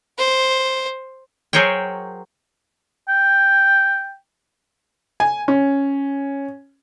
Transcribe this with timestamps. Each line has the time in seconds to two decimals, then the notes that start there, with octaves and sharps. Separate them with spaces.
0.18 C5
1.53 F#3 G#4 A#4 C5 C#5 G5
3.09 G5
5.20 G#5
5.48 C#4